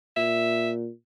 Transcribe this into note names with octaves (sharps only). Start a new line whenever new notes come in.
A#2 E5